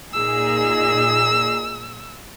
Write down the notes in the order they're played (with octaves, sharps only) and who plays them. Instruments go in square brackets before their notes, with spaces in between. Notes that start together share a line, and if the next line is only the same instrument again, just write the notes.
[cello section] A#2 D#4 G#4 [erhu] E6